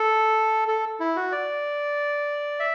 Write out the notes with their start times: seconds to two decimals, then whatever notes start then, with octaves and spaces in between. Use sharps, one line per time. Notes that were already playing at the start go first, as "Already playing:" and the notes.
Already playing: A4
0.68 A4
1.00 E4
1.16 F#4
1.32 D5
2.60 E5